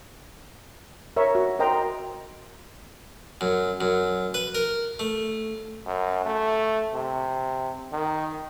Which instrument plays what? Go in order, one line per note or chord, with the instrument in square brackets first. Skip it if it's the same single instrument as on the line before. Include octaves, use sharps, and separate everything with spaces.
[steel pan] A#4 C#5 E5 C#6
F#4
A#4 C5 D#5 G5 A#5 C6
[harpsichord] F#2
F#2
B4
A#4
A3
[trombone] F#2
A3
C3
D#3